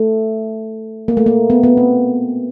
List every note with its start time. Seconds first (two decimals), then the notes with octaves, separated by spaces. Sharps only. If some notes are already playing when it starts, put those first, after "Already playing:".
Already playing: A3
1.08 A#3
1.17 A3
1.26 A#3
1.50 B3
1.63 B3
1.77 C4